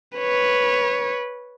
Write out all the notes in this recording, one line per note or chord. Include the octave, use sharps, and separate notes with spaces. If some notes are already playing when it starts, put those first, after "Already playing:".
B4 C#5